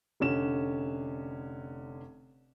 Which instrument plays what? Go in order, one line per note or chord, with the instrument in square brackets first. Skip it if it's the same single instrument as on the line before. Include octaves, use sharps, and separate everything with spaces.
[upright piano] F1 D3 C#4 E7